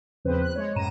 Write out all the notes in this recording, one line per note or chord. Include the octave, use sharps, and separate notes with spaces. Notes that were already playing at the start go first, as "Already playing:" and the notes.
E2 C#3 F3 C4 B4 C5
F#6
G#3 C#5
F#2 A2 A#5 D#7 E7